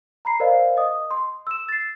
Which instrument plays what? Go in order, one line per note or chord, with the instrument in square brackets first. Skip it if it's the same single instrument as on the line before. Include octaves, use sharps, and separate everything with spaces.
[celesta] A#5 B5 C7
A#4 C5 D5 D#5 F5
D#5 D#6
C6
E6 E7
A6 C7